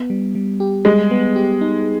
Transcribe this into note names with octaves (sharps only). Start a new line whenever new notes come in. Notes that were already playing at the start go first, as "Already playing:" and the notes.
Already playing: B3
G3
G3
G4
G3 G#3
B3
G4
D#4